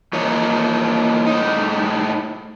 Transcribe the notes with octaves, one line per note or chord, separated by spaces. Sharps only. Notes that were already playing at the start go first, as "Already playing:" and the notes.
E3 F3 A#3 D#4 C#5
A2 D#4